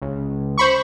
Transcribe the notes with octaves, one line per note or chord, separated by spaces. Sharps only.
C#2
C5 B5 C#6